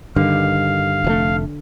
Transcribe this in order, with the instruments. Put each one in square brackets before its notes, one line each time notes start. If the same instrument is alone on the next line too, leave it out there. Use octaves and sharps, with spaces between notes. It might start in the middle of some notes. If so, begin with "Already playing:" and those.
[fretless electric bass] G2 D#3 [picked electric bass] D3 [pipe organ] F5
[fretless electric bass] F1 B2 A3